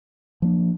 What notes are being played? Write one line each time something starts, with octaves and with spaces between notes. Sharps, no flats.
F3 A#3 D4